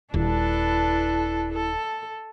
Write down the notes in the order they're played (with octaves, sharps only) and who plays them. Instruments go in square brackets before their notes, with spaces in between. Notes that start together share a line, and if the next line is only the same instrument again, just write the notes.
[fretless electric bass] D#1 [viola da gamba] D4 A4 B4 [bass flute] E4
[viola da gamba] A4